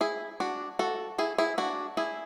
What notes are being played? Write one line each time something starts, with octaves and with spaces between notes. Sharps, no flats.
E4 G#4
D4 F#4
F#4 A4
E4 G#4
E4 G#4
D4 F#4
E4 G#4